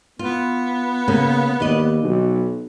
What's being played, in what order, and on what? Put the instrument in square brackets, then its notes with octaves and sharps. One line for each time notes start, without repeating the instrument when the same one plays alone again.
[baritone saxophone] B3 [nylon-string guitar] F4
[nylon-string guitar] C#3 A#3
[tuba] D#2 [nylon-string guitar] D5 D#5
[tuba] B1